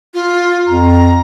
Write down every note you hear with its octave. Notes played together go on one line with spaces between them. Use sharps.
F4
F2 A#5